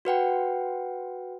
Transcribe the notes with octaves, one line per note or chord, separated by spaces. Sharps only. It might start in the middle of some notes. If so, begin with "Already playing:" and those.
F#4 B4 F#5 G5